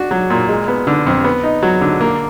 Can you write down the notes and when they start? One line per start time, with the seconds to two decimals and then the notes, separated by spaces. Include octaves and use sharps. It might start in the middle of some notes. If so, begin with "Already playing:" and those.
Already playing: D4 F#4
0.11 F#3
0.30 A#2
0.48 G#3
0.68 B3
0.87 D3
1.06 F2
1.24 B3
1.43 D#4
1.63 F#3
1.81 D3
2.01 A#3